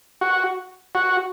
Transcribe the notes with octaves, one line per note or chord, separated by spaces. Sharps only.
F#4
F#4